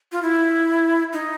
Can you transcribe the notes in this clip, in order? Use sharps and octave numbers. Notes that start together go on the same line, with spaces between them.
F4
E4
D#4